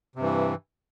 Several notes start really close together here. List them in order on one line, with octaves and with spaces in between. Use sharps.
C3 G2 E3